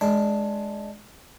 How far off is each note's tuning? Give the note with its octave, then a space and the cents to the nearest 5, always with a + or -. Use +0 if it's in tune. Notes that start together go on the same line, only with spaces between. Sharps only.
G#3 +15 D4 +0